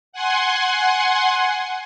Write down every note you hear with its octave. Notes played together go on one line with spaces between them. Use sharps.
F#5 G#5 C6